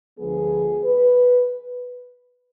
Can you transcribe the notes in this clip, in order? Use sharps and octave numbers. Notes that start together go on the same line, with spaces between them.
D2 D3 F3 G#3 B3 G#4
B4